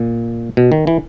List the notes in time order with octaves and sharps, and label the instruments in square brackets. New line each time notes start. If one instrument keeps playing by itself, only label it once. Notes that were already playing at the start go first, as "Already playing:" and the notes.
Already playing: [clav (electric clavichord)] A#2
B2
D#3
E3